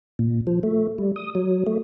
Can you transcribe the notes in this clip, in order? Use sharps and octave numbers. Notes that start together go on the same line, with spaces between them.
A#2
F3
A3
G3
D#6
F#3
A3